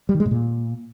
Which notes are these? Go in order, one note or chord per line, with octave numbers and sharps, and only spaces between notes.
G3
D#3
G#3
A2
A#2